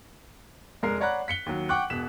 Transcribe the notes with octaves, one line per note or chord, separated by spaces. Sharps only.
F1 G#3 A#4 C7
C#5 D5 F#5 A#5 B5 F#6
B6 C#7 G7
D#2 F#3
F#5 G5 C#6 D6 F#6
E1 B2 B6 E7